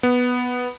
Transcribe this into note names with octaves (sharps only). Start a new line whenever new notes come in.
B3